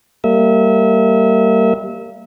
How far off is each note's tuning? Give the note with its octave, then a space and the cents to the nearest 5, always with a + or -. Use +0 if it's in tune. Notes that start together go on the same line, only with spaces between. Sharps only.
G3 +0 A#3 -25 E5 -30